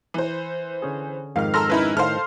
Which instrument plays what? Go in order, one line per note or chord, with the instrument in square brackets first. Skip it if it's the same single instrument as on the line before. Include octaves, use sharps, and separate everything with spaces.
[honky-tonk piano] E3 C5
[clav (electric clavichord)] D3 C#4 G#4
[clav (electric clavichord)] F2 G#2 D#3 [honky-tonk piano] F5 F6
[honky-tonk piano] A4 C6 A#6 [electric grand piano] A#5 E6 F6
[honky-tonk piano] C#4 E5 B5 [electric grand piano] D#4 E4 B4
[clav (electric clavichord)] A2 D#3 [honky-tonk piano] A4 C5 F5 [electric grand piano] C6 F6